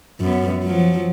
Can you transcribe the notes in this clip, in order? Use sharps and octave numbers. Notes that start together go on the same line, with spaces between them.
F#2 B3
F3 F#3